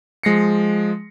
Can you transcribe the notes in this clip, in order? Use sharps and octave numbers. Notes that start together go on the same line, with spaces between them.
F3 G#3 A#6 C7 C#7